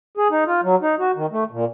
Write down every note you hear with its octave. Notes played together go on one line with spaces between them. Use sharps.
G#4
D#4
F4
F#3
D#4
F#4
D#3
A3
A#2